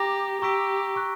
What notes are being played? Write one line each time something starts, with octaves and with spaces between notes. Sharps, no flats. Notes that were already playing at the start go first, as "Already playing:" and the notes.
Already playing: G4 A#5 D6 A#6
G4 A#5 C#6 E6 B6 D7
A#5 C#6 F#6